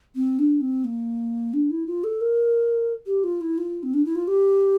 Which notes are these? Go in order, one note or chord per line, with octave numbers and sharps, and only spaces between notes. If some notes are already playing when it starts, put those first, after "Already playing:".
C4
D4
C4
A#3
D4
E4
F4
A4
A#4
G4
F4
E4
F4
C4
D4
E4
F4
G4